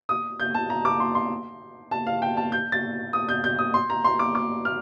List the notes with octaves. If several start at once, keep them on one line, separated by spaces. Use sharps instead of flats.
D#6
G6
A5
A#5
D6
C6
C6
A5
F5
G5
A5
G6
A6
D#6
G6
G6
D#6
C6
A#5
C6
D6
D6
F6